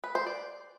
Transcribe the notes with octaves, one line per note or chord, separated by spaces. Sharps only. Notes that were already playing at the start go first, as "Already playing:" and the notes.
B4
C5
D5